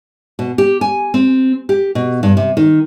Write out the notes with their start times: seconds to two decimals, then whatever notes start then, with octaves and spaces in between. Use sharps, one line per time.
0.39 B2
0.58 G4
0.81 G#5
1.14 C4
1.69 G4
1.95 B2
2.23 G2
2.37 C3
2.57 D#3